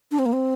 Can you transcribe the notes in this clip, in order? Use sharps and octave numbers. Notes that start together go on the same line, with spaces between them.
D4
C4
A#3
C4